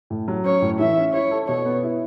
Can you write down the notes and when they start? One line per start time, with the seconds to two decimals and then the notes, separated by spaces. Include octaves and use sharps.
0.10 A2
0.28 F#3
0.45 C#4 C#5
0.62 A2
0.79 E3 E5
0.97 C#4
1.14 E4 C#5
1.31 A4
1.48 B2 C#5
1.65 B3
1.83 E4